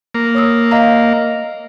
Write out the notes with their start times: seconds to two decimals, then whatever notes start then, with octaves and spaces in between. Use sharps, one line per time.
0.15 A#3
0.35 C#5 D#6 E6
0.71 D#5 F5 A#5